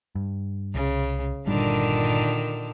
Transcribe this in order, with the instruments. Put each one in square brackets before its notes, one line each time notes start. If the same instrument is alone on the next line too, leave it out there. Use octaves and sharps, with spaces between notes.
[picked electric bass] G2
[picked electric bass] C2 [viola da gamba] C#3
[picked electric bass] G1 G3 D4 [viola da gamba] A#2 D3 D#3